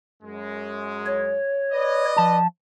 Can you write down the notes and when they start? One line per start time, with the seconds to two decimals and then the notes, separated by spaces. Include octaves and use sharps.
0.23 F#2 G#3
1.06 C#5
1.72 B4 D5 D#5
2.17 F3 A5